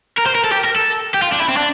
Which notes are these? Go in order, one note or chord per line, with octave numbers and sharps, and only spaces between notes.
A#4
C5
A#4
A4
G4
A#4
A4
G4
F4
D4
E4
C4
D4